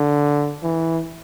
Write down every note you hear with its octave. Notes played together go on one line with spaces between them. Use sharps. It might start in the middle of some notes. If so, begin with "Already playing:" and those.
Already playing: D3
E3